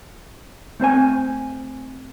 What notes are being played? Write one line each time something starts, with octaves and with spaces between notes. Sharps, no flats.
A3 C4 C5 G#5